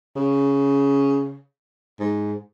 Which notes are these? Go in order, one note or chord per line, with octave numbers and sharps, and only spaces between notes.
C#3
G#2